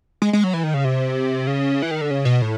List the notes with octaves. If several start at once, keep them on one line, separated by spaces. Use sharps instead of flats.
G#3
G#3
F#3
E3
D#3
C#3
C3
C#3
E3
D#3
D3
C#3
B2
A2